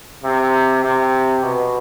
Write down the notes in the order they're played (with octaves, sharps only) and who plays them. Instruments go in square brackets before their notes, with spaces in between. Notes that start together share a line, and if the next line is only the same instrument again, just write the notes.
[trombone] C3
C3
B2